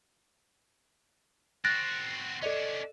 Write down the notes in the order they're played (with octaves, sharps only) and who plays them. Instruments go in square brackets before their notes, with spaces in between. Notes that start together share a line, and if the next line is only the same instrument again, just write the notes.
[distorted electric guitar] C4 F#4 [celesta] F#6 A6 A#6
[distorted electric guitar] C#4 D4 [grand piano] A4 D5 D#5